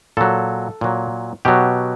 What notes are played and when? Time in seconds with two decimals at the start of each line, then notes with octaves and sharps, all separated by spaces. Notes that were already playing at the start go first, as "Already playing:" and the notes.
0.17 A#2 F#3 A4
0.81 A#2 F#3
1.45 B2 F#3 G4